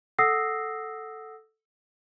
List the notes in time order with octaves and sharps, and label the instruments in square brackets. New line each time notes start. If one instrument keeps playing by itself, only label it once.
[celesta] A4 F#5 D#6 E6 A#6 C7